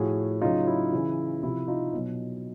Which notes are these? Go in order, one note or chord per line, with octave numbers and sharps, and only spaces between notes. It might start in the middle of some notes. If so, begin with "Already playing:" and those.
Already playing: A2 F3 F#4 G#4
C#3 F#3 D#4 F4
E4
C#3 E3
C3 F3 E4
D#4 F4
B2 F#3